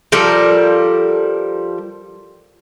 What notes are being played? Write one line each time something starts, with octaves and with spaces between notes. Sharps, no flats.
F3 G3 A4 A#4